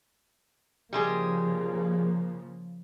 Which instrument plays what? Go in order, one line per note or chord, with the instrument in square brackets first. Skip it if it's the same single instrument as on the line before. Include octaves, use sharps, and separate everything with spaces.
[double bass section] C#3 F3 A#3 [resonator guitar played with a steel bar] G3 G#3 G#4